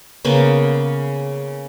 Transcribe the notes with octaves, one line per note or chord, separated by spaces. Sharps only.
C#3 A#3 B3